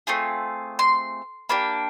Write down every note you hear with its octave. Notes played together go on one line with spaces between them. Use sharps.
A3 C4 F4 G#4
C6
A#3 D4 G4 B5